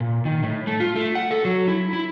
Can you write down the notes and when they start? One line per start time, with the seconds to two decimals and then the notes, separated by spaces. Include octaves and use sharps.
0.01 A#2
0.25 D#3
0.43 A2
0.67 A3
0.80 F4
0.96 A3
1.15 F#5
1.31 A4
1.45 F#3
1.68 E4
1.93 E4